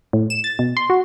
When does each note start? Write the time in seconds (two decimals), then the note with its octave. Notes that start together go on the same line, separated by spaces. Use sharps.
0.13 A2
0.30 E7
0.44 A6
0.59 B2
0.77 C6
0.90 F#4